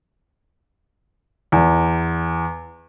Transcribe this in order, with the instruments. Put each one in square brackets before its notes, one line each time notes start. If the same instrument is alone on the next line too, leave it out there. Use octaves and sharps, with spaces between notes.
[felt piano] E2